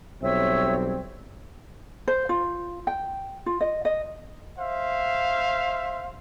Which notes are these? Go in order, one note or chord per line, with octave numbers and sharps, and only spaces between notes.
B1 G3 C4 C#5 E5 E6
C5
F4
G5
F4
D#5
D#5
C5 E5 F5